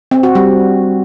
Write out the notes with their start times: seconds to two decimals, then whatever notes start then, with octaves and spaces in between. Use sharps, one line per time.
0.11 C4
0.23 F#4
0.35 G3